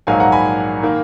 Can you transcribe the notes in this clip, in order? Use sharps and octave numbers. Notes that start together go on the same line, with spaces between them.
A#1 G#2 D#3 F#3 A#3 F5 G#5
F#5 A#5
G#5 B5
D#3 A#3